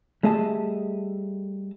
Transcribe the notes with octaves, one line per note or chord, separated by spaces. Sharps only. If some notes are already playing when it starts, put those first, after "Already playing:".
G3 A3 G#4 D#5 E5 A5